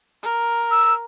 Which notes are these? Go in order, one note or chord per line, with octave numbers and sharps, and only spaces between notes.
A#4
E6